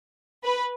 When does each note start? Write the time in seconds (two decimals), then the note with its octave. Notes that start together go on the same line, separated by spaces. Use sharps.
0.44 B4